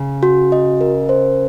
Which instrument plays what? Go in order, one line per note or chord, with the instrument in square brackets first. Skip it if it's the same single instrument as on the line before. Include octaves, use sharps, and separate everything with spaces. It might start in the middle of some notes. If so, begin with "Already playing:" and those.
Already playing: [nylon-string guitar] C#3
[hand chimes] F#4
D#5
A#4
C5